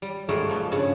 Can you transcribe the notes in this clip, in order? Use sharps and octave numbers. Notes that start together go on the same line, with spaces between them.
G3
G#2 G3 A3 F#4 G#4 A#4
B2 F3 A#3
G2 C#3 F#5